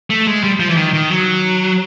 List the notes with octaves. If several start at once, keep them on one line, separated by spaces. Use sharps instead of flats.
A3
G#3
G3
F3
E3
D#3
D#3
F#3